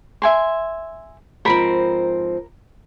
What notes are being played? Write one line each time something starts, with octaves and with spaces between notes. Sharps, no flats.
E5 G#5 C6
G#2 F3 C4 A#4 B5